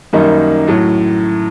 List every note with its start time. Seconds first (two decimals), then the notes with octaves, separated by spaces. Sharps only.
0.13 F#2 D#3 G3 A#3 D#4
0.68 A2 F#3